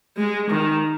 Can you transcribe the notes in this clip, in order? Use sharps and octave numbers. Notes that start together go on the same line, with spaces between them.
G#3
D#3